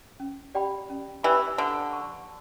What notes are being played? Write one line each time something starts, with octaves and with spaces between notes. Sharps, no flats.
C#4
G4 D5 G5 B5
C#4
E3 G4 D5 G5 B5
D3 B4
D5 A5 C#6